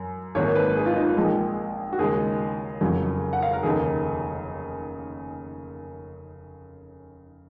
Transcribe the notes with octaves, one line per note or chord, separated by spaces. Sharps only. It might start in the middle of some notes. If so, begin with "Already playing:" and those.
Already playing: F#2
G#1 G#2 D#3 F#3 A#3 C#5
B4
G#4
F4
D#4
A#1 A#2 G#3
F#4
D#2 C#3 G#3 G#4
F#1 F2 C#3 F#3
F#5
F5
A#4
F1 D#2 C#3 G#4